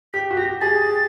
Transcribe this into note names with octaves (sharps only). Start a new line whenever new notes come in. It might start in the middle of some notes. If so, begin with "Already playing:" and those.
G4 B6
F#4
G4 A#6
G#4 A6
G4